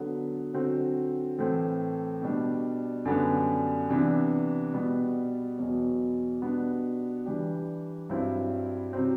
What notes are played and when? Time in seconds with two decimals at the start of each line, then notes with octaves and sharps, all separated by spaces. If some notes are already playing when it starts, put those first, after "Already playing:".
Already playing: D3 F#3 B3
0.54 D3 F#3 C4 F#4
1.39 A2 E3 A3 C4
2.22 B2 G3 D4
3.05 F#2 D3 G3 B3 D4
3.89 C3 E3 B3 D4
4.73 B2 G3 B3
5.58 E2 B2 F#3
6.42 B2 G3 B3 D4 F#4
7.26 E3 G3 D4 G4
8.10 G2 F#3 C4 E4
8.93 C3 F#3 C4